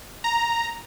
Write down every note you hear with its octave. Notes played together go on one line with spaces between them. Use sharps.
A#5